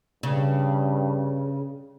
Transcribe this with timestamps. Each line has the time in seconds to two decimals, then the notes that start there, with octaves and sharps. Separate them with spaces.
0.23 G2 C#3